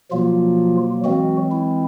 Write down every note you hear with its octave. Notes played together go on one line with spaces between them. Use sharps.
B2 F3 F#3 A#3 F4
E3 F#3 G#3 C4 F#4
E4